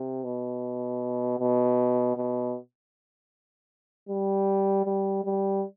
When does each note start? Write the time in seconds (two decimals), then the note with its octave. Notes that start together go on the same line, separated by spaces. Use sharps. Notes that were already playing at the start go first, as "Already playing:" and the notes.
Already playing: C3
0.24 B2
1.39 B2
2.17 B2
4.09 G3
4.86 G3
5.24 G3